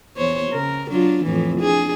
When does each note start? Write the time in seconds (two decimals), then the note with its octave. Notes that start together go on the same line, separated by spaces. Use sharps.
0.17 E2 C5 C#5
0.53 C#3 A#4
0.90 F#3 D4 F4
1.24 F2 A2 E3
1.61 D4 G#4